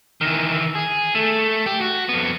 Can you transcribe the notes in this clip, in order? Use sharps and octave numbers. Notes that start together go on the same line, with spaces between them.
D#3 E3
G#4
A3
G4
F#4
F2 B3